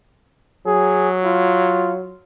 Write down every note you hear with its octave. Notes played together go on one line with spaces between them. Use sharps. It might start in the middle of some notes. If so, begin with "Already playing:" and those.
F#3 G#4
F4